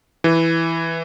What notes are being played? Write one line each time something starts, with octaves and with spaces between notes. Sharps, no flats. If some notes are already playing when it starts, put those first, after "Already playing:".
E3